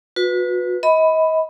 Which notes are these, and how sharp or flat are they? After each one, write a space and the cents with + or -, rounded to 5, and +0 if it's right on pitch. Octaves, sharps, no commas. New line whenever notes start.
F#4 -40 B4 +0
D#5 +35 B5 +10